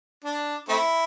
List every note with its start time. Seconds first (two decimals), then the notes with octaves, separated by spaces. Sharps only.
0.24 D4
0.68 A3 C4 E4